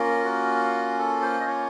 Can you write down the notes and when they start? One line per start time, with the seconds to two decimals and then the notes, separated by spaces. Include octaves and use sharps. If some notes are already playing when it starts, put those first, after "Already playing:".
Already playing: A#3 C#4 F4 A#4
0.25 F#4
0.99 A4
1.22 C5
1.40 D#5
1.47 C#5